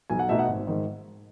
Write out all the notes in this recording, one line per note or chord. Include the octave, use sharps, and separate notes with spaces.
B1 G#5
F#5
B2 A3 D#4 E5
F#5
G#1
G#2 D#3